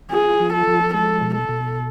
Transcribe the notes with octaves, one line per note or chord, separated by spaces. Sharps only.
F4 G#4
F3
A4
F3
G#3 A4
B2
A4
B2